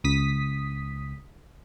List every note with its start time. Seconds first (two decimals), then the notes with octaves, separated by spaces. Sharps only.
0.04 C#2 D#6 B6